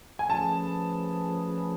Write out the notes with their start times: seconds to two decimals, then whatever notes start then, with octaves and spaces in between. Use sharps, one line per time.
0.19 G#5
0.30 F3 A3 C#4 G#4 B4 A5